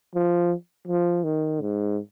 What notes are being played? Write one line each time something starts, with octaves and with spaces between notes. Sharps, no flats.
F3
F3
D#3
G#2